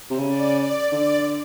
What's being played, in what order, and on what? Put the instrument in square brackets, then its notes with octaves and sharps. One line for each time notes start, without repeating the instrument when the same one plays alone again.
[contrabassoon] C3
C#3
[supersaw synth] D5
D5
[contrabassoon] D3 [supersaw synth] D5